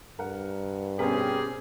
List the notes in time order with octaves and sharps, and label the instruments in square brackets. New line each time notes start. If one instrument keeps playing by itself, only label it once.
[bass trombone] G2 [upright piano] A#4 F#5
[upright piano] B2 A#4 [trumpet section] C4 G4 G#4 [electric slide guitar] C#4 B4